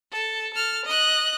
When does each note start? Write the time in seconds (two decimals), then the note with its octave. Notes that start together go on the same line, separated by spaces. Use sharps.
0.12 A4
0.53 A4 F6
0.85 D#5 F#6